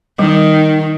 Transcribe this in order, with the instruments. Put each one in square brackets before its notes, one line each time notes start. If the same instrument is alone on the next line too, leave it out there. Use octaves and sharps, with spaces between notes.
[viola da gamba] D#3 [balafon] G3